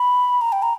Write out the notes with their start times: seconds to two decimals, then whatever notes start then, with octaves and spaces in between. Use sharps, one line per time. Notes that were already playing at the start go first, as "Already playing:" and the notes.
Already playing: B5
0.41 A#5
0.52 G5
0.62 A#5